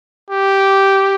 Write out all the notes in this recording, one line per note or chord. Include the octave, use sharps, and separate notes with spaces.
G4